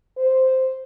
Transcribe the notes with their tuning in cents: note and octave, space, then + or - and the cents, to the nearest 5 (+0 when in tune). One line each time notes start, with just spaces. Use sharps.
C5 -5